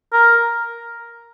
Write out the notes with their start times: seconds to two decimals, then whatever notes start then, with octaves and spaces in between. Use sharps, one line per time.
0.13 A#4